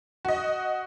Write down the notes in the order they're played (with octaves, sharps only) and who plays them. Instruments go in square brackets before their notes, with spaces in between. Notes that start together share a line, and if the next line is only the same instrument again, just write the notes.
[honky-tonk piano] F#4 D#5